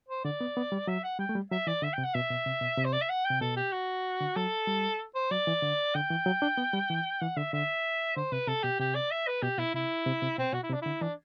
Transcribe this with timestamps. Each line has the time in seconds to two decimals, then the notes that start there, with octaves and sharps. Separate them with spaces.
0.08 C5
0.24 D3 D5
0.41 B3
0.57 B3
0.72 G3
0.87 F#3 E5
1.03 F#5
1.19 G3 G5
1.29 A3
1.35 G3
1.51 F#3 E5
1.67 E3 D5
1.82 D3 E5
1.93 C3 G5
2.04 F#5
2.14 B2 E5
2.30 B2
2.46 C3
2.61 B2
2.77 C3
2.85 C5
2.93 D5
3.01 E5
3.09 F#5
3.25 C3 G5
3.41 B2 A4
3.56 G4
3.72 F#4
4.20 D3
4.36 F#3 A4
4.67 G3
5.15 C5
5.31 F#3 D5
5.47 E3
5.62 D3
5.95 D3 G5
6.10 E3
6.26 F#3
6.42 D4
6.58 B3
6.74 G3
6.90 E3
7.21 E3 F#5
7.37 D3 E5
7.53 D3 E5
8.16 D3 C5
8.32 C3 B4
8.47 C3 A4
8.63 B2 G4
8.79 C3 G4
8.95 D5
9.11 E5
9.27 B4
9.42 B2 G4
9.58 B2 E4
9.75 C3 E4
10.06 C3
10.22 C3
10.38 B2 C4
10.53 B2 F#4
10.63 E4
10.69 C3
10.73 D4
10.82 D3 E4
11.01 E3 D4